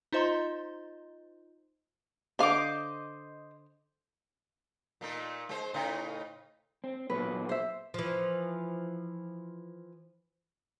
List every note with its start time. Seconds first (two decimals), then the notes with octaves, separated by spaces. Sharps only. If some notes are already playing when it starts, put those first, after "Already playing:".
0.12 D#4 F4 C5 D#5 A#5 C6
2.39 D3 C5 D#5 F5 D6
5.01 A#2 A3 D#4
5.49 G#3 C5
5.74 A2 C#3 D#4
6.84 C4
7.10 A#2 F#3 B3 B4
7.49 C5 E5
7.94 E3 F3